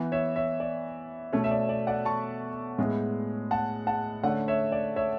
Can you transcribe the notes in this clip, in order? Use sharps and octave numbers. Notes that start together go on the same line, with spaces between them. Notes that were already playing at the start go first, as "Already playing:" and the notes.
Already playing: E3 B3
C#5 E5
C#5 E5
D5
B2 A3 C#4 C#5
E5
D5
D5
D5 F#5
A5 C#6
A2 G#3 B3
F#5 A5
F#5 A5
D3 A3 C#4 D5 F#5
C#5 E5
D5
C#5 E5